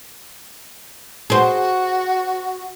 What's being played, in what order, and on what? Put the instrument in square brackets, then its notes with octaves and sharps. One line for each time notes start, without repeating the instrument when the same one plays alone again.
[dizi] F#4 [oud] G#4 C5